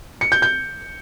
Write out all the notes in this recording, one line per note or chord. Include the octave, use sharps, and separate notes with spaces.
C#7
G6
G6